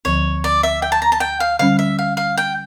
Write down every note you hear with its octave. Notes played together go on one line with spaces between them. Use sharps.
D2 D3 F3 C#5
D5
E5
G5
A5
A#5
A5
G5
F5
D3 G3 C#4 F5
E5
F5
F5
G5